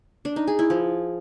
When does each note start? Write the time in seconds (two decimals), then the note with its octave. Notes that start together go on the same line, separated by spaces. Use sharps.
0.25 D4
0.36 D#4
0.47 G#4
0.59 E4
0.70 F3